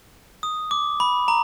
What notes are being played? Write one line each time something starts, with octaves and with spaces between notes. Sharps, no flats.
D#6
D6
B5
A#5